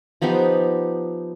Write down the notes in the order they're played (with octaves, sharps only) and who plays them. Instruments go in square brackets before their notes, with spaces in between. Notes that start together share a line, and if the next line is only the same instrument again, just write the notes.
[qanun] F3 B3 D#4 G4